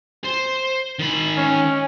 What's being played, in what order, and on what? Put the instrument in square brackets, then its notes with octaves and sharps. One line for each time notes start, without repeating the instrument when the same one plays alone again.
[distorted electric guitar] C5
D#3 B5
[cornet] C#4